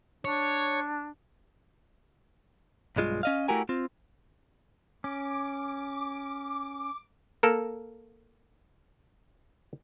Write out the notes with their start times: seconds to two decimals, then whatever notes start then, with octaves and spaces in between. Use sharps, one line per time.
0.25 D4 C#5
2.96 B1 G2 G#3 F4
3.23 C#4 D#5 F5
3.48 A3 E4 F#4 G4 A#4 G#5
3.69 C4 F4
5.04 C#4 D6
7.43 A#3 A4 A#4